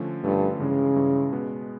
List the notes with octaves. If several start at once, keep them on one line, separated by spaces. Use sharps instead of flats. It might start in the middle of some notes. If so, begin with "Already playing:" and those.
Already playing: D3 F3 A3 C#4
G2 D3 F3 A3 C#4
G2 C#3 E3 G#3
G2 E3 G#3
B2 G#3 B3